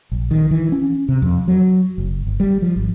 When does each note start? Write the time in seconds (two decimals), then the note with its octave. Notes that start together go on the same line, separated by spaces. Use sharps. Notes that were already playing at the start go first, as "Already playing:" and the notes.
0.12 A#1
0.31 D#3
0.51 E3
0.72 C#4
1.09 C3
1.22 F2
1.48 F#3
1.98 F#1
2.27 G1
2.40 G3
2.62 F3
2.76 G#1